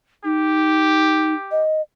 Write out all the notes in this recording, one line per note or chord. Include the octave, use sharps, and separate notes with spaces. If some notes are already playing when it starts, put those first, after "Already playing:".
D#4 G4
D#5